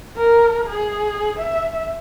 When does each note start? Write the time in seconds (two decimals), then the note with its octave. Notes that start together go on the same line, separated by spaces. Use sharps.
0.17 A#4
0.69 G#4
1.39 E5